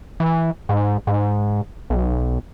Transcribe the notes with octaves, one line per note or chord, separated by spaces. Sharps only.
E3
G#2
G#2
B1